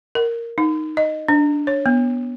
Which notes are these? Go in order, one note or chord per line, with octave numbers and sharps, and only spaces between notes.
A#4
D#4
D#5
D4
C#5
B3